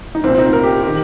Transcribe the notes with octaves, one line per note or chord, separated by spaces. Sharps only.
D#4
C2 A#2 C4
C4
D#4
A#4
G4
D#3 G4